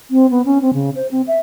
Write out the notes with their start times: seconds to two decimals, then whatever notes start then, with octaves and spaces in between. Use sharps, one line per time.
0.11 C4
0.31 B3
0.45 C#4
0.62 C4
0.74 C#3
0.96 C5
1.11 C4
1.28 E5